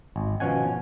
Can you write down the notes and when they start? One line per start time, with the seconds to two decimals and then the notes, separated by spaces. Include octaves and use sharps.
0.16 G#1
0.40 B2 F3 C#4 F#5 G#5